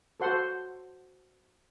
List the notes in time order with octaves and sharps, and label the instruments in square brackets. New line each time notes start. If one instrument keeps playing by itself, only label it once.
[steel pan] F#4 A4 C5 F#5 C6